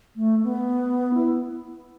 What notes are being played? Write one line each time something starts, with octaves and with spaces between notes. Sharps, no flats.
A3
B3
E4